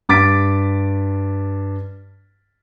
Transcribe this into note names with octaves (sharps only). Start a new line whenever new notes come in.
G2 D6 A6 B6 D7